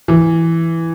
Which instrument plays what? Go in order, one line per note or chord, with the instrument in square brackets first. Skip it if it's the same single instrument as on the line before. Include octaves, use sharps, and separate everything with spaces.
[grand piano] E3